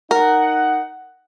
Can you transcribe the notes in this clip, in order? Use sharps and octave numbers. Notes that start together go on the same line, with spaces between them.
D#4 A#4 F#5